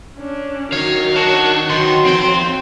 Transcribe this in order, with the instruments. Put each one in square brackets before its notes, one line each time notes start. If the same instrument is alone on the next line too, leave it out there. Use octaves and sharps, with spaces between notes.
[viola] C#4 D4
[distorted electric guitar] D#3 D#4 [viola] F#3 A#4 [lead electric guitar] C#5 [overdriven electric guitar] F5
[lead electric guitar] D4 [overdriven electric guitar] F#4
[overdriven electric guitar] D#3 [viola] F#3 [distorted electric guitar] F#4 B4 [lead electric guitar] C6
[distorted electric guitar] F2 [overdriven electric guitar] C4 G5